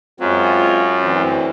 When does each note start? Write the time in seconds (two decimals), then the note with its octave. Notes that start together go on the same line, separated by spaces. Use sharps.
0.20 F#2 F#3 G#3 C4 F4
1.01 D2 E3 C4